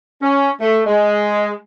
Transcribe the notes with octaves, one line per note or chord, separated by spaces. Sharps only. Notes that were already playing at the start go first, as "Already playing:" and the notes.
C#4
A3
G#3